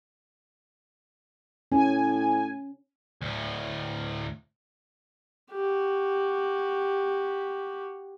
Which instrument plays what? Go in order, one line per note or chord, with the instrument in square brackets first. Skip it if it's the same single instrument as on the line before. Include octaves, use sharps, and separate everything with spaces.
[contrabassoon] A2 [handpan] C#4 [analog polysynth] G#5
[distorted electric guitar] D2 A2
[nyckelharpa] F#4 G4